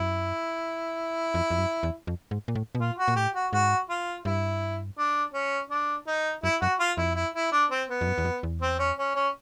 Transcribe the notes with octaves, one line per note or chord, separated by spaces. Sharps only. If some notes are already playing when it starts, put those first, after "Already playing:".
Already playing: F#2 E4
F2
F2
F#2
E2
F2
G#2
A#2
A2
B2
A#2 F4
F#4
A#2
A2 G4
F#4
G#2 F#4
F4
G2 E4
D4
C#4
D4
D#4
F#2 E4
F#2 F#4
F4
F2 E4
E4
E4
D4
C4
B3
F2
F#2
E2
F2
E2
C4
C#4
C#4
C#4